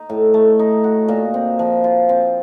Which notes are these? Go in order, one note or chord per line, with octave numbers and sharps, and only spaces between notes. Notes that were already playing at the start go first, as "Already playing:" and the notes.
Already playing: D#4
A2
A3
D#4
F#4
A#2
C4
F3
F4
C4